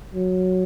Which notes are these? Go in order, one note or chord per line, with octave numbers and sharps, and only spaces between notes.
F#3